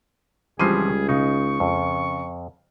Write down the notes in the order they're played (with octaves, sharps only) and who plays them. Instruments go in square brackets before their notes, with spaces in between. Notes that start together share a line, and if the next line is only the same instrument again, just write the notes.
[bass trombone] C#2 [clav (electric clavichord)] E3 F3 C4 [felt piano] G3 C7 D#7 [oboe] G#4
[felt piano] C#3 [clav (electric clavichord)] D#4 [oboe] C#6
[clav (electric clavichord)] F2